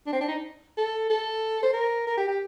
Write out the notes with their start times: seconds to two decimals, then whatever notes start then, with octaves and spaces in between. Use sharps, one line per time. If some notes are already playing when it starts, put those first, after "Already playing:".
0.07 D4
0.13 C4
0.21 D4
0.28 D#4
0.78 A4
1.10 A4
1.63 C5
1.73 A#4
2.07 A#4
2.17 G4
2.28 G4